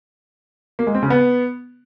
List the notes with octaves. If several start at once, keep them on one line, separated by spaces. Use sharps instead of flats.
A#3
G#3
C4
C#3
B3